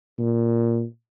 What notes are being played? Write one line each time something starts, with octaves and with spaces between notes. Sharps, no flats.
A#2